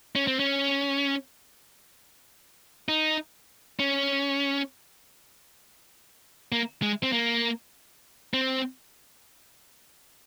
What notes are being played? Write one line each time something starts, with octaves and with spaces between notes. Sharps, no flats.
C#4
C4
C#4
D#4
C#4
A#3
G#3
C4
A#3
C4